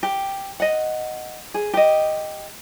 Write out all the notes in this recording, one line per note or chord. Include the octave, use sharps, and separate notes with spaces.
G4
D#5 F#5
G#4
G4 D#5